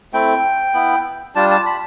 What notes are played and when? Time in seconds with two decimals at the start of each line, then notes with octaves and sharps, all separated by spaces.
0.13 A3 C4 E4 G5
0.74 B3 E4
1.35 G3 D4 F4 A5
1.51 A5
1.66 B5